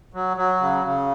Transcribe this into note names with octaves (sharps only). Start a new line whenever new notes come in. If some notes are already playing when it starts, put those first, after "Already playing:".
F#3
F#3
C#3
C#3